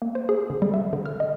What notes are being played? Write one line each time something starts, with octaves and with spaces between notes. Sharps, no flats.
A#3
C5
G#4
D3
G3
E5
D3
F6
D#5